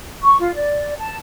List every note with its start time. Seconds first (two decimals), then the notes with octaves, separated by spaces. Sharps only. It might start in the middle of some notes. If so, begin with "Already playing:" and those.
0.22 C#6
0.40 F4
0.55 D5
0.98 A5